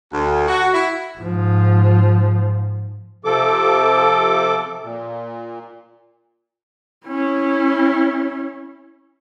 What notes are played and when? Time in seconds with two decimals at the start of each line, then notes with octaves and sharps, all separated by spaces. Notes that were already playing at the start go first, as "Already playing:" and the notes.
0.12 D2
0.47 F#4
0.74 E4
1.19 G#2 F3
3.25 C3 F3 A4 D6
4.83 A#2
7.06 C#4 E4